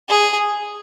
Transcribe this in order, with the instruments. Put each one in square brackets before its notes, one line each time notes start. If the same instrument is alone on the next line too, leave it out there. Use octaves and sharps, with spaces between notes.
[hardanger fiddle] G#4